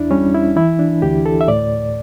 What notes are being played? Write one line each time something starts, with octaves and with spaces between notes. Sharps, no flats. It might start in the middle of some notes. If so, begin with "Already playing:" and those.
Already playing: E2 D4 E4
G3 C#4
E4
E3 E4
D4
D2 G4
A4
E5
A2 D5